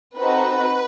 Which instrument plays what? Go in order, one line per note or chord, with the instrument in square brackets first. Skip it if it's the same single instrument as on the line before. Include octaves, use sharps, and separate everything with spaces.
[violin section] C4 D#4 F#4 A4 B4